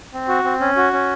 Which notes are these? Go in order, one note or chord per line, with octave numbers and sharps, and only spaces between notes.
C4
F#4
C4
C#4
F#4
C#4